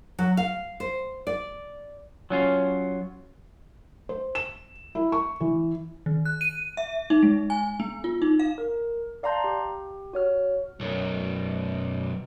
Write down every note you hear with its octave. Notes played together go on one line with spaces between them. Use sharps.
F#3
F5
C5
D5
F#3 C#4 F4
C5
E7
E4
C#6
E3
D#3
F#6
D#7
E5
D#4
G#3
G#5
B3
F4
D#4
F5
A#4
D5 F5 A5 A#5 C6 G6
G4
F#4 C#5 F6
B1 F#2